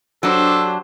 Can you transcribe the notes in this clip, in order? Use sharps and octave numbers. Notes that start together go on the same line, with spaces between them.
F#3 D4 G4 A4 C5